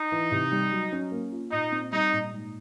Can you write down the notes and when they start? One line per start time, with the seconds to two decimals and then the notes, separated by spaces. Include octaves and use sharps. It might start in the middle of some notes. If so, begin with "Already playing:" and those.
Already playing: D#4
0.12 E3
0.31 C3
0.52 G3
0.72 F#3
0.92 C#4
1.11 A#3
1.32 F4
1.52 A#2 D#4
1.72 C4
1.92 G3 D#4
2.13 A#2
2.32 G#2